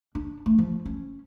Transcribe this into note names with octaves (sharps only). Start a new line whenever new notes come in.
D4
A3
F3
C#4